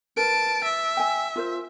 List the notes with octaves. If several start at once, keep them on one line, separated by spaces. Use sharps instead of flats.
A#4 B4 A5 D7
E5
G5 G#5
F4 A#4 C5